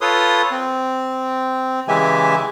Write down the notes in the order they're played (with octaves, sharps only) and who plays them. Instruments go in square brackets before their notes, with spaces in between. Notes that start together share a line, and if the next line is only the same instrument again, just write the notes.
[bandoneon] F4 A4 B4 C#5 C6 D#6
C4
C#3 E3 G#3 G4 E5 G#5